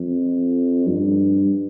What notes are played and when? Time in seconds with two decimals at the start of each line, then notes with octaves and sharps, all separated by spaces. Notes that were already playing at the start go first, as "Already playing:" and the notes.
Already playing: F2
0.87 G2